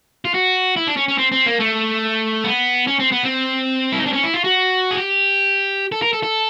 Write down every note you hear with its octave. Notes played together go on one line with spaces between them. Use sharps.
F4
F#4
E4
D4
C#4
C#4
C4
C4
A#3
A3
B3
C#4
C4
B3
C4
E4
D#4
D4
C#4
E4
F4
F#4
G#4
G4
A4
A#4
A4
A4